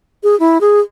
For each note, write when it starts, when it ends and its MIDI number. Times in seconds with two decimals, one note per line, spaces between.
0.23 0.38 68
0.40 0.58 64
0.61 0.80 68